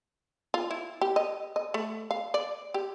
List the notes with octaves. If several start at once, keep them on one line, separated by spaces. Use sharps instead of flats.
F4
E4
G4
D#5
D#5
A3
F5
D5
G4